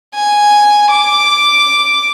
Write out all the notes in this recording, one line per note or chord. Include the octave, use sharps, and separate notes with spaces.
G#5
D6